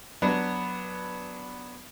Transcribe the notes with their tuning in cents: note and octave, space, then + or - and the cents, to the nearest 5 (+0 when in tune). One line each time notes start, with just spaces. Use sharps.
F#3 +0 B3 +0 D4 -10